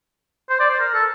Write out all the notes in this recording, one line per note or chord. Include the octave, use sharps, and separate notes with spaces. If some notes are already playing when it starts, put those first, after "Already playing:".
C5
D5
C5
A#4
A4